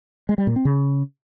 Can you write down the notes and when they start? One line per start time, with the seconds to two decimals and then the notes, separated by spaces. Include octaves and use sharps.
0.29 G#3
0.38 G3
0.47 A#2
0.56 C4
0.65 C#3